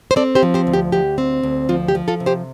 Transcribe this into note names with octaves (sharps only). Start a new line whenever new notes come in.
C5
C4 A4 D5
G4 C5
F3
G4 C5
D2
G4
D2 G4
C4
D2
F3 F4
G4
F3
F4 A4
C3
G4 C5